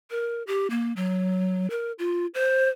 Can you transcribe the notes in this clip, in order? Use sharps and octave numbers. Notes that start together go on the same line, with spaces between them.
A#4
G4
A#3
F#3
A#4
F4
C5